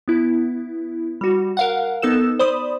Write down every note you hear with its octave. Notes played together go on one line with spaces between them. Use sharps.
B3 E4
G3 F#4
A#4 F5 F#5
B3 D#4 A4 E6 E7
C5 D5 B5 D#6